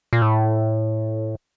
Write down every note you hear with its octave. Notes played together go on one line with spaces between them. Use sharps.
A#2
A2